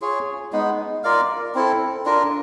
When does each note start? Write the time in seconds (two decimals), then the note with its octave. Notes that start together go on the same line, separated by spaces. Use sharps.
0.01 F4 G#4 C#5
0.53 G#3 B3 D#4
1.03 F4 A#4 D5 F5
1.55 C4 E4 A4
2.05 D4 F4 A#4